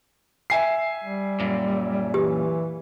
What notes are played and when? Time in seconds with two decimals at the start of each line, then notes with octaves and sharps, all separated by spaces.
0.50 E5 G#5 C7
1.04 G3
1.40 F#2 A#2
2.14 E3 G4